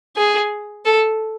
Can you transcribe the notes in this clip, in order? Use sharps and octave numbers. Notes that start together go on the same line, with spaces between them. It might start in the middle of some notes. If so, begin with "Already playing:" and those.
G#4
A4